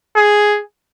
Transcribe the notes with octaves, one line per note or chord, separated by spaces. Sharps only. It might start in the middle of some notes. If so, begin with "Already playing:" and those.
G#4